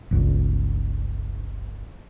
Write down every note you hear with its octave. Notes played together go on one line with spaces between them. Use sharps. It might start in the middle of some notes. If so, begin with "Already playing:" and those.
G1 C#2